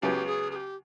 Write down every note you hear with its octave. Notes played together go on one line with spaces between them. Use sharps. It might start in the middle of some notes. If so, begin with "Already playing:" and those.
C#2 C#3 F#3 B3 G4
G#4
G#4
G4